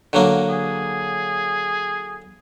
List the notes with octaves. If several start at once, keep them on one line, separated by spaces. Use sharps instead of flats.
D3 F#3 A#3
G#4